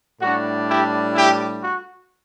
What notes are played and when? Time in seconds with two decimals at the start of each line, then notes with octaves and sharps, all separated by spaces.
0.21 A2 G3 D4 F#4
0.68 E4 G4
1.14 E4 G4
1.62 F#4